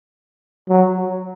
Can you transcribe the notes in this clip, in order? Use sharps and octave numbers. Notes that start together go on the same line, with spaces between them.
F#3